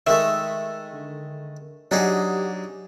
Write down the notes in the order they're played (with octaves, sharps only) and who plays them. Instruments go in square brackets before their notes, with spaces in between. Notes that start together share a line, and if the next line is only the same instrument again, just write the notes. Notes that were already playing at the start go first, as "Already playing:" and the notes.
[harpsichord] D#3 G#3 A3 [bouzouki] E5
[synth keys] D3
[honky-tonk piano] F#3 [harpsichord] D4 D#4 G#4 [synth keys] G4 F#5